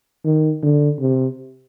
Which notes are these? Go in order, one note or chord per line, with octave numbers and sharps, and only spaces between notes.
D#3
D3
C3